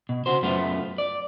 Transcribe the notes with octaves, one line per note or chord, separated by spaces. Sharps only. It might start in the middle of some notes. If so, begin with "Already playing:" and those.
B2
C#3 F#4 C5
F#2 A3 B3 F4
D5